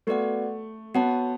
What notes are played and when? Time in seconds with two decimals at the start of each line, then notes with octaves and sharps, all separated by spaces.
0.07 A3 B3 F#4 B4 D5 F#5
0.94 B3 F#4 C#5 F#5 A5